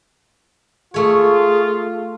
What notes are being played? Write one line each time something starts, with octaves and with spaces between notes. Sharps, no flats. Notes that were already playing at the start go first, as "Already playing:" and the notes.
A3 F4 G#4 C#5